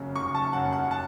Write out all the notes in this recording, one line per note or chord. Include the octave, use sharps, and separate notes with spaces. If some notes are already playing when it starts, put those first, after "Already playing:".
Already playing: F#1 F#2 C#3 F#3
F#1 C#6
A5
F#2 C#3 F#3 F#5
F#5
A5